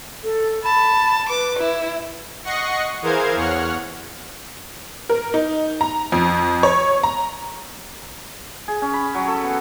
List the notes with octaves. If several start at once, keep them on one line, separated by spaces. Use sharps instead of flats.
A4
A5 B5
B4 D6
E4
D#5 F#5 C#6 A#6 C7 C#7
E3 G#4 A#4 C5 F5 G#6
E2 C#5 F#5 F6
A#4
D#4
A#5
F2
C#5
A#5
G#4
C#4
B5
F#3
A4
B3